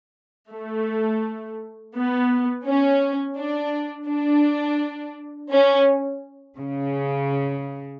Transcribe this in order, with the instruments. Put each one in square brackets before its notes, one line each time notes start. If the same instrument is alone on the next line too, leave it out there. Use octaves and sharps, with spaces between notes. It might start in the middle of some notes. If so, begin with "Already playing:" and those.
[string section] A3
B3
C#4
D4
D4
C#4
C#3